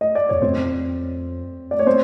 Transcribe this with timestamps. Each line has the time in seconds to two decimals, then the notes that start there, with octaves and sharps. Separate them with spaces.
0.01 D#5
0.15 D5
0.29 E2 C#5
0.42 F2 C4 C5
1.71 D5
1.79 C#5
1.86 C4 C5